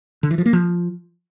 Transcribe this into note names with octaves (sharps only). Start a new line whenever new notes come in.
D3
E3
F3
A#3
F3